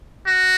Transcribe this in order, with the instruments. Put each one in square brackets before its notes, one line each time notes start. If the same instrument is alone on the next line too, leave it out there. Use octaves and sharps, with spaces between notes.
[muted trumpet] F#4